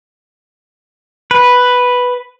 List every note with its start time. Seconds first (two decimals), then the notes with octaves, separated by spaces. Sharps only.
1.31 B4